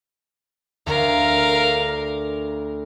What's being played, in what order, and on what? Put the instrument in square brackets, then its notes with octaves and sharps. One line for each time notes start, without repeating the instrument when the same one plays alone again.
[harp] D2 [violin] A#4 F5